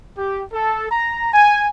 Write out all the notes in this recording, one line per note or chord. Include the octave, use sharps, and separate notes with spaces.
G4
A4
A#5
G#5